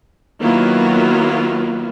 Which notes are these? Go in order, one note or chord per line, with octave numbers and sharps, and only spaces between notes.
D#3 F#3 A#3 B3 E4 F4